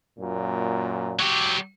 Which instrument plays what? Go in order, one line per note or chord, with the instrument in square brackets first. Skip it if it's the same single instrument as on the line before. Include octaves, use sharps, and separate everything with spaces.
[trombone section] F#2 A#2
[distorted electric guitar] F#3 G4